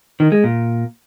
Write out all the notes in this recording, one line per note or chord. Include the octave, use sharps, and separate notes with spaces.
D#3
G#3
A#2